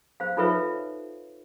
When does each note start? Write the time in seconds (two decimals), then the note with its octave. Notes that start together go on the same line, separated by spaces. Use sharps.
0.20 C5 F5
0.37 D#4 F4 A4 B4 C#5 E5